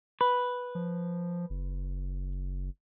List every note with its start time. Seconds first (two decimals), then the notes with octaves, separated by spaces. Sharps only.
0.21 B4
0.75 F3
1.50 F#1